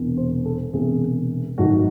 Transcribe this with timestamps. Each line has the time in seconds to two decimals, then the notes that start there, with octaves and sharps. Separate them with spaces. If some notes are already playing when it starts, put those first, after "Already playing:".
Already playing: E1 E2 C3
0.17 C5
0.45 A4
0.73 E1 E2 C3 G#4
1.58 G#1 G#2 F#3 A3 F#4